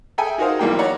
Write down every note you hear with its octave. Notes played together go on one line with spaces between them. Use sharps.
G#4 A4 E5 G5 G#5
D#4 F#4 G#4 A#4 C5 F5
B1 E3 G3 A#3 F5 G5
C#5 D5 F#5 A#5